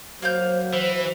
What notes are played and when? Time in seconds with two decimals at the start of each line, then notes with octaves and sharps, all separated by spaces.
0.22 F#3 A#3 C5 F5 G6
0.74 E3